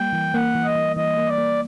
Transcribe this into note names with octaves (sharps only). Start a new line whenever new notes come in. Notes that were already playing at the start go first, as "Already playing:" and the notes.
Already playing: G3 A#3 G5
E3
A#3 F#5
E3
D#5
E3
E3 D#5
A#3
D5
A#3